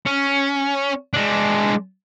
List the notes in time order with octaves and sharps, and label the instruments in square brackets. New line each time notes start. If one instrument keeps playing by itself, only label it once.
[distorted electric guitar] C#4
G#3 D4